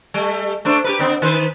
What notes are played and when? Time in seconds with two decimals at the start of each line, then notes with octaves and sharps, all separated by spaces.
0.14 G3 A3
0.65 A3 D4 C5
0.84 G4 A#4 B4
0.99 D3 B3 C4
1.22 D#3 B4 C5